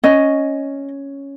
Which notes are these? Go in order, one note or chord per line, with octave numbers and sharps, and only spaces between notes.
C#4 D#5